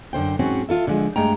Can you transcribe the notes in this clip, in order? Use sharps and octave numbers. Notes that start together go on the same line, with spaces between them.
F#2 D3 C5 G5
G#2 F#3 C4 C#4 F#4
F4 A4 E5
D3 F3 G#3
G2 G#3 A3 G5 A#5